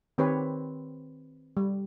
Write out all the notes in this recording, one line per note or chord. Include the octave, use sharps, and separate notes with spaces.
D#3 C4 G4 B4 C#5
G3